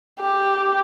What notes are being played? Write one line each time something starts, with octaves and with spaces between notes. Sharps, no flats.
G4